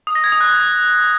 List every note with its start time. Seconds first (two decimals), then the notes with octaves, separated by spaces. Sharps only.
0.07 D#6
0.15 A#6
0.24 G#6
0.32 D#6
0.41 F#6